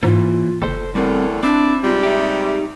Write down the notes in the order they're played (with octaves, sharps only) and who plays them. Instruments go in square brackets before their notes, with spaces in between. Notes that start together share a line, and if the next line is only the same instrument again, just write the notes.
[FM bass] G#2 [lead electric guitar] E3 A#3 [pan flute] F4
[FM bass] F#1 [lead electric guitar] A4 C5
[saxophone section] E2 A2 D3 [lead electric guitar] G3 C4 [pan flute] A#4
[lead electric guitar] C4 [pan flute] D4 [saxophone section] E4 D5
[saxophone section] G#2 C3 G3 [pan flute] F4
[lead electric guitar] D#4 G4 [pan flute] E5